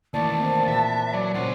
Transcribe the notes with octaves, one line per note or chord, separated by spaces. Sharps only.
D#3 E3 A3 A#3 D5 A5
A#3 C4
A#2 B4 E5
F#3 D5
A#2 C#3 C#4 C5 F#5